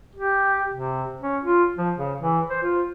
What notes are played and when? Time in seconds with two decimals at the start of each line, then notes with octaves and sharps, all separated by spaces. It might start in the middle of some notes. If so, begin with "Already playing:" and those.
0.15 G4
0.73 C3
1.21 C#4
1.43 F4
1.76 F3
1.97 C#3
2.21 E3
2.50 C5
2.63 F4